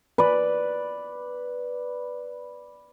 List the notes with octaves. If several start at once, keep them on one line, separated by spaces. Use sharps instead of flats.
B4 D5